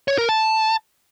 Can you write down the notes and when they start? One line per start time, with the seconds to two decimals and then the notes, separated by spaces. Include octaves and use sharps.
0.08 C#5
0.18 A#4
0.29 A5